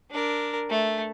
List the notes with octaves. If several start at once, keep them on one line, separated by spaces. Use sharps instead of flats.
D4 A#4
A3